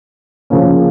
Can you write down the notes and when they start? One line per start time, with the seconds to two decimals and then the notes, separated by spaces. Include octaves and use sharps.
0.50 C#3 F3 A#3 C#4